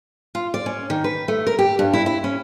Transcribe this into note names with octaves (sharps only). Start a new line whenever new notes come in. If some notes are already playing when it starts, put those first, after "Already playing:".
F4
D5
C#4
D#3
B4
A3
A#4
G4
G2
E4
E4
C#4